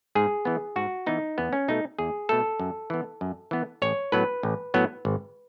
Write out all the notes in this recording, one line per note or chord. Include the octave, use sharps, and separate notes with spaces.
G#2 G#4
E3 B3
G#2 F#4
E3 B3 D#4
E2 B3
C#4
B2 A3 D#4
E2 G#4
B2 A3 A4
F#2
E3 B3
F#2
E3 B3
A1 C#5
A2 F#3 B3 B4
A1
A2 F#3 B3
G#1